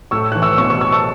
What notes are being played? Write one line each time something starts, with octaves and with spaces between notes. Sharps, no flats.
A2 C#6 E6
E3 F#6
C#6 E6
B2 C#6 E6
C#6 E6
C#6 E6
A5 C#6